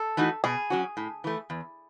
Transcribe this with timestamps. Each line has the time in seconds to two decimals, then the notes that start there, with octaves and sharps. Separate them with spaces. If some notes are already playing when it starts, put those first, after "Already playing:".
Already playing: A4
0.17 E3 A3 D#4 F#4
0.44 B2 G#4
0.70 F#3 C#4 F#4
0.97 A2
1.24 E3 A3
1.50 E2